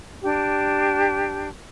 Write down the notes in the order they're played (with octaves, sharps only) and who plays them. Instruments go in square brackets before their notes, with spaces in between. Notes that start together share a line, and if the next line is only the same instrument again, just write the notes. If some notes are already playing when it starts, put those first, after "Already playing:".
[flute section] D4 G4